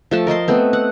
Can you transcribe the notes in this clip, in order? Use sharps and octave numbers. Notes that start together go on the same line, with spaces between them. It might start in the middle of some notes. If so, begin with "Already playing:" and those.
F3 A3 A5
A#4 D#5 A5 C6
A3 B3 C4
F#5